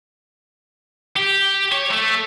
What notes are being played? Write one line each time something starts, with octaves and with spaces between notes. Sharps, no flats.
G4
C#5
A3